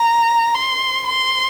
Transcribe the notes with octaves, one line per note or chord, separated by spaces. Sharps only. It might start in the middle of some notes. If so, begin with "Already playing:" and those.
Already playing: A#5
C6
C6